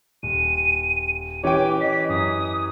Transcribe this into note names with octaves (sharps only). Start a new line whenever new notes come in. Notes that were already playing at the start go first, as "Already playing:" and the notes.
D#1 D#7
E3 C#4 G4 C#5 G5 D6
D#5 B6
F#2 D#6